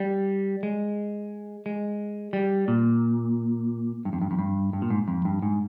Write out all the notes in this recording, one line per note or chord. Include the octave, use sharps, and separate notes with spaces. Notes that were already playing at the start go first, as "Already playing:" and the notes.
Already playing: G3
G#3
G#3
G3
A#2
G2
F2
G2
F2
G2
G2
A#2
G#2
F2
G2
G#2